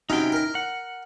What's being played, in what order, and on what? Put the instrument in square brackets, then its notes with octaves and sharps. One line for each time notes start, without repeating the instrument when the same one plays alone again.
[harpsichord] C3 F#3 C#4 [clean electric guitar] D#4 E4 G5
[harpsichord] A#4 A#5
[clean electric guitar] F#5